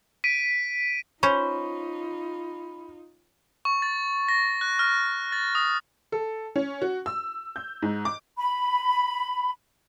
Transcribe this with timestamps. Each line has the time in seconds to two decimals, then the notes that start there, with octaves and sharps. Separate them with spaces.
0.24 B6 D7 D#7
1.23 C#4 D#4 F4 C5 B5 C#6
3.65 C#6
3.82 A6
4.28 A#6
4.61 F#6
4.79 F6
5.32 A6
5.55 D#6
6.12 A4
6.56 C#4
6.82 F#4
7.06 E6
7.56 G6
7.82 G#2
8.05 D6
8.37 B5